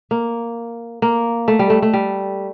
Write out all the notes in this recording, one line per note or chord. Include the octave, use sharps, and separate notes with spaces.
A#3
A#3
A3
G3
A3
A3
G3